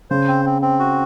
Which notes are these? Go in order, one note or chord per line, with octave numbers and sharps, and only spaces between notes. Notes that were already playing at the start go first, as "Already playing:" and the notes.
C#3 C5
C4
C4
C4
F#4